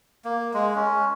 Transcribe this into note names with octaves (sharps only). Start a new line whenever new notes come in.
A#3
G#3
C#4